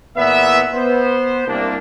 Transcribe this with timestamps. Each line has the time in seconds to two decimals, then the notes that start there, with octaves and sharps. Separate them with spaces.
0.17 E2 A#2 B3 E4 B4 E5
0.75 B3 C5
1.47 C2 A#3 D4